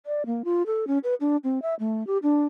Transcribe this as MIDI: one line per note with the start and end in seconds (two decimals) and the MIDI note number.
0.06 0.26 74
0.26 0.43 58
0.45 0.63 65
0.66 0.87 69
0.87 0.98 61
1.04 1.14 71
1.21 1.37 62
1.44 1.62 60
1.62 1.75 76
1.80 2.06 57
2.07 2.18 67
2.23 2.46 62